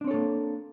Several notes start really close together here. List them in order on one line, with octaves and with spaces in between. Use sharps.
D4 C4 C#5 A4 A#3